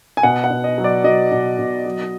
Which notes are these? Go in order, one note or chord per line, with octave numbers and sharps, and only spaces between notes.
G#5
B2 F#5
F#5
B2
D#5
F#3
D5
F#3 D#5
B2
B2
F#3